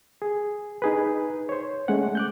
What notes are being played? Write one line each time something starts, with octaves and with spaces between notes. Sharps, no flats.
G#4
D#4 G#4 B4
C5 C#5
G#3 A3 C#4 F#5
D6 F#6 G6